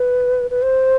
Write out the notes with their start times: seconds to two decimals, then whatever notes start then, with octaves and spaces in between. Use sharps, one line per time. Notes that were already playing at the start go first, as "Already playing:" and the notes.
Already playing: B4
0.50 B4
0.62 C5